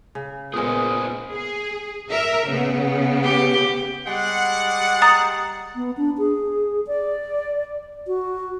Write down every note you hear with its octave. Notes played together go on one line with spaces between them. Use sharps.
C#3
A#2 G#3 B3 G#4 A#4 C5 D#6
G#4
A#4 E5
C#3 B3
G4
G3 G#3 F#5
A#5 D#6 A6
B3
D4
G#4
D5
F#4